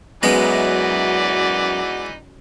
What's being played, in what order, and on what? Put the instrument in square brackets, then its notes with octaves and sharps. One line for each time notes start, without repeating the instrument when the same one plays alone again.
[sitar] F#2 [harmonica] E3 D#4 D5 [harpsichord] G#3 B3 D#5 [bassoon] F#4